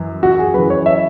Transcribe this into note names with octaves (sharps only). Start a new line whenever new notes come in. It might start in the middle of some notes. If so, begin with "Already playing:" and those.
Already playing: F#2 E3
F#4
G#4
F#2 E3 B4
C#5
E5